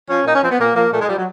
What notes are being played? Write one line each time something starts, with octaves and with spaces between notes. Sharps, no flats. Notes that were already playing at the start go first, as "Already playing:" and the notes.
F3 C#4
A#2 D#4
C#4
F3 C4
B3
A#2 A#3
F3 A#3
A#2 A3
G#3
F3 G3
F#3